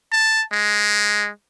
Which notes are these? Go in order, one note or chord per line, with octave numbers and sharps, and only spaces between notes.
A5
G#3